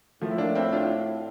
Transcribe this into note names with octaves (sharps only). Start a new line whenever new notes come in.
A2 F3 A3
E4
A#3 D4
C4 E4
D4 F4